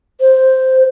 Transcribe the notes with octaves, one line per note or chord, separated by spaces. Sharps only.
C5